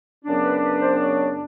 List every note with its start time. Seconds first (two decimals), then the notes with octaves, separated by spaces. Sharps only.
0.24 F#2 C#3 F#3 B3 D4
0.43 B4
0.62 B4
0.80 C5
0.99 C#5